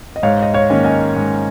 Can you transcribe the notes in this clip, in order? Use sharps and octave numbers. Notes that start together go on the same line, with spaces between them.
D#5
G#2 C#5 F5
D#5
C#5 F5
D#3 A#3 C#4
D#5 G#5
G#2